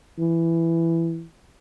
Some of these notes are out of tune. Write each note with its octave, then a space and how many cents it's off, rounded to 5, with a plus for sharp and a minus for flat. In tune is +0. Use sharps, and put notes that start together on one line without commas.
E3 +10